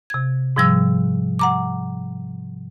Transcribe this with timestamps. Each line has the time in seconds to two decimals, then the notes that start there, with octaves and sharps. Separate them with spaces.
0.10 C3 G#6
0.56 G#2 C3 F3 G3 E6
1.39 F#5 A#5 D6